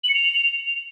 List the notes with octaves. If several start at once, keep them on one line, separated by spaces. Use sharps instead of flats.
F#7
C#7
F7